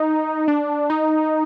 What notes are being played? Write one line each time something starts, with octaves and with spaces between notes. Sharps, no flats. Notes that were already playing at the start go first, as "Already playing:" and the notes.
Already playing: D#4
D4
D#4